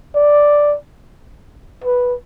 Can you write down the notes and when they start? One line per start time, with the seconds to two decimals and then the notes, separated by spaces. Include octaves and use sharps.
0.15 D5
1.84 B4